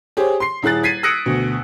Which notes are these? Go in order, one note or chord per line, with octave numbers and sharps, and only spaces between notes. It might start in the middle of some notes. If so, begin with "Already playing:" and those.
G4 G#4 C5 C#5
C6 C7
D#1 E4 G#4 F#6 A6
G#6 B6 C7 D#7
D#6 E6 F#6 A#6 C#7 D7
D2 B2